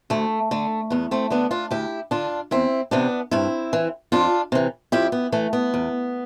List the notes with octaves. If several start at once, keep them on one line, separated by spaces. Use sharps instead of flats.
D2 A3
D3 A3
E2 B3
A3 C4
D3 B3 D4
D4 F4
D2 E4 G4
D3 D4 F4
E2 C4 E4
C3 E3 B3 D4
G2 C4 E4
E3
F2 D4 F4
C3 E3
F2 E4 G4
B3
E3 A3
B3
E2